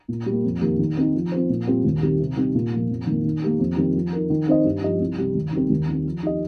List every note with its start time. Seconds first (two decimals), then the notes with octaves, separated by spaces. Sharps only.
0.08 A#2
0.26 G3 A#3
0.44 F2
0.61 D#3 A#3 G4
0.79 D#3
0.97 C4 D#4
1.14 F3
1.32 C4 F4 C5
1.49 A#2
1.67 G3 C4 F4
1.85 D#2
2.02 D#3 G3 C4 G4
2.19 C3
2.36 G3 C4 D#4
2.55 A#2
2.73 F3 A#3
2.89 F2
3.07 D#3 A#3
3.25 D#3
3.42 A#3 G4 A#4
3.59 F2
3.77 D#3 G3 C4
3.95 F3
4.13 D#4 A#4
4.30 D#3
4.48 C4 D#4 C5 D#5
4.65 G2
4.83 F3 D#4 G4 D#5
5.00 C2
5.18 C3 G3
5.35 D#2
5.53 D#3 G3 C4
5.70 D#2
5.88 D#3 C4
6.05 F3
6.23 D#4 G4 D#5